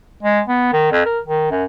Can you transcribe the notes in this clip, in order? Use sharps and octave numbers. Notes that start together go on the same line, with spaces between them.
G#3
B3
D#3
F2
A#4
D#3
F#2